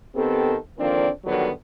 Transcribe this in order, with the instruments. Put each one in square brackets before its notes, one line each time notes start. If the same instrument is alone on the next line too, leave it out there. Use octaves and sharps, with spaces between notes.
[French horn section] D#3 B3 C4 G4 A4
D3 D#3 F3 A#3 C4 D4
D3 D#3 F#3 G3 B3 F#4